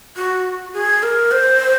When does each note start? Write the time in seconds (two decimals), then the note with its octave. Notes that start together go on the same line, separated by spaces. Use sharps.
0.17 F#4
0.74 G#4
1.03 A#4
1.31 C5